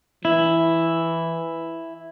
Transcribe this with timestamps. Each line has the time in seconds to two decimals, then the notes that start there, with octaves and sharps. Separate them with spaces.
0.25 E3 E4